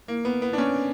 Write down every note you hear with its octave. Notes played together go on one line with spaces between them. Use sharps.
A#3
B3
B3
D4
C#4